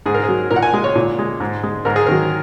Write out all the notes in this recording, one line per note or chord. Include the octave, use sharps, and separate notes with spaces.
G#2 G#4
A#4
G#4
F#3
A#2 A#4
F#5
G#5
G#3
C#5
A#2
G#3
G#2
G#3
G#2 A#4
G#4
D#3 F#3 A#4